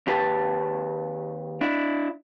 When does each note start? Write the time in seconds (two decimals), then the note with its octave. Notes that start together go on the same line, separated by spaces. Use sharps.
0.07 D#2 G4 B4 A5
1.61 D4 E4